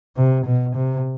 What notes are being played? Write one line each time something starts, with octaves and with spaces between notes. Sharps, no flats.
C3
B2
C3